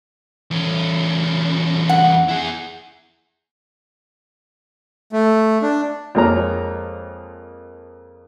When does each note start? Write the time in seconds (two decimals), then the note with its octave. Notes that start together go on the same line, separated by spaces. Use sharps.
0.51 E2 C#4
1.89 F#5
2.28 E4 G#4
5.12 A3
5.62 D4
6.15 F2 G#3 A#3 A#4 C#5 A#5